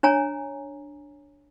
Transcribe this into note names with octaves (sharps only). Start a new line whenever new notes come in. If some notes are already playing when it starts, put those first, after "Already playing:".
D4 C#5 G#5 A#5